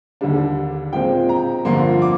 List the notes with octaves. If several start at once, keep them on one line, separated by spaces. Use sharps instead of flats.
D#2 D3 G3 D4
A#2 G#3 C4 G5
A#5
G2 D3 F3 A#3 C6
D6